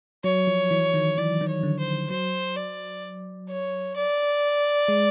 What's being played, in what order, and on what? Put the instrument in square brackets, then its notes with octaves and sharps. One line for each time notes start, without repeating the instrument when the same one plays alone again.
[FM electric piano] F#3 [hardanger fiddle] C#5
[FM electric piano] F3
E3
D#3
[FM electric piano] E3 [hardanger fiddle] D5
[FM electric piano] D#3
[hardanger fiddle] C#5
[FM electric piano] D3
[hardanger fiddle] C5
[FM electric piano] F#3 [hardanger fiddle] C5
[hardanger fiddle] D5
C#5
D5
[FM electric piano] G#3